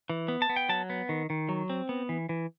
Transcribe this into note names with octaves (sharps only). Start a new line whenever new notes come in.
E3
B3
A5
B3
G5
F#3 A5
B3
D#3
D#3
F#3
C4
B3
E3
E3